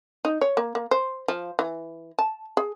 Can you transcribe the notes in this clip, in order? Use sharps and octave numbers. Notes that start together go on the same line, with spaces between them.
D#4
C#5
A#3
A#3
C5
F3
E3
A5
G#4